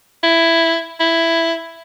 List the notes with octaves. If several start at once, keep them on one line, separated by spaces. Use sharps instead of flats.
E4
E4